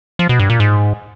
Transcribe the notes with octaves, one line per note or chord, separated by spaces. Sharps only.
F3
B2
G2
A#2
G#2